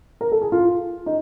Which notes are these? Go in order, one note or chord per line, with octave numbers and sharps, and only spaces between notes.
A#4
A4
G#4
F4
D#4